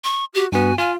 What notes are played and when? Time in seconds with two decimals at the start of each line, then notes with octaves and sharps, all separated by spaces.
0.04 C#6
0.34 F#4 G4
0.52 G2 B3 F#4 G#5
0.78 F4 F5 G#5